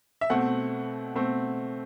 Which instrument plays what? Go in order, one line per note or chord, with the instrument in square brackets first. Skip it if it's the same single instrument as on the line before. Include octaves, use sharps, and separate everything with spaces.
[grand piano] E5
B2 A3 C4 F#5
B2 A3 C4